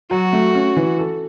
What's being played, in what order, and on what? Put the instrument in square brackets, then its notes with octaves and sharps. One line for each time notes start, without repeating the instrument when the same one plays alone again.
[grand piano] F#3 [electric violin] F#4
[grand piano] A3
C#4
E3
A4